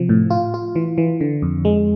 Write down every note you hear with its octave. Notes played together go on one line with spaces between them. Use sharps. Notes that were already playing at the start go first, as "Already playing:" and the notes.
Already playing: C3 F3
A2
F4
F4
E3
E3
D3
F2
G#3